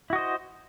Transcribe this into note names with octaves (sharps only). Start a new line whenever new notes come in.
E4 F#4 C5 D#5